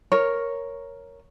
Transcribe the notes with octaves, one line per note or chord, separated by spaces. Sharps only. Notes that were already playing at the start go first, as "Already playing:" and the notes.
A#4 C#5